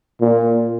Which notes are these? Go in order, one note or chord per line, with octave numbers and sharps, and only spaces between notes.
A#2